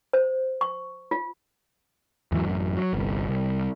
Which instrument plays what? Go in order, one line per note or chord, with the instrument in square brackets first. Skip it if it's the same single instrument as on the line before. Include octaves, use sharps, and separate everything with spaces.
[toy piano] C5
C#6
F4
[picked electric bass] E2 G#2 E3 F#3
A1 F#2
F#3
G1 C2
C2